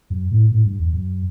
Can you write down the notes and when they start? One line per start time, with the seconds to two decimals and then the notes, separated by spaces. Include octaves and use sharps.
0.10 F#2
0.31 A2
0.52 A2
0.65 G2
0.79 E2
0.93 F#2